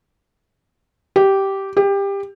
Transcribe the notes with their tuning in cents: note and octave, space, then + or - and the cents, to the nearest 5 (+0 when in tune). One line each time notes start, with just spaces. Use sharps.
G4 -10
G4 +20